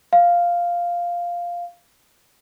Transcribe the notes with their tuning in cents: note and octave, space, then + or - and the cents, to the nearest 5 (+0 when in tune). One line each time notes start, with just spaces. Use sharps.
F5 +0